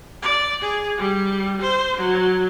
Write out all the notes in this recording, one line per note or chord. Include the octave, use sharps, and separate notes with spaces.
D5
G#4
G3
C5
F#3